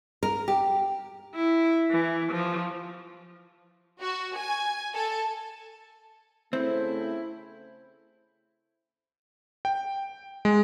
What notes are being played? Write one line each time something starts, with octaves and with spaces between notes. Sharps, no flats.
A#4
G4
E4
E3
F3
F#4
G#5
A4
C#3 A3 C4 E4 C5
G5
G#3